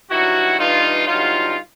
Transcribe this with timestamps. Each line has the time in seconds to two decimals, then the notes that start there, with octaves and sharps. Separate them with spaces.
0.10 G2 D#3 F#3 E4 F#4
0.58 G2 E3 D#4 F4
1.07 G2 D3 F#3 D#4 F4